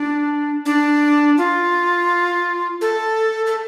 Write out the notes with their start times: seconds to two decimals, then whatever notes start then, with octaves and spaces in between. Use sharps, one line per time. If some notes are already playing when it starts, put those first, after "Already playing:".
Already playing: D4
0.66 D4
1.38 F4
2.81 A4
3.46 A4